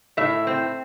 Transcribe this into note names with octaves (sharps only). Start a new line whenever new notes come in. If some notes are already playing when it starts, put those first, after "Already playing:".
A2 E5
C4